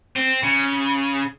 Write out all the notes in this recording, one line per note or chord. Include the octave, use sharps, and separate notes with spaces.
C4
C#3